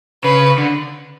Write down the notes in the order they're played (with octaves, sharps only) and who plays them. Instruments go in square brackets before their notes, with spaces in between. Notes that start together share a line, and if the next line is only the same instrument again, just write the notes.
[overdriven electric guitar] C#3 [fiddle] B4
[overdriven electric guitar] D3